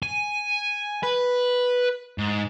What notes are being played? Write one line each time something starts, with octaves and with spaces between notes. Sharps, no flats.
G#5
B4
G#2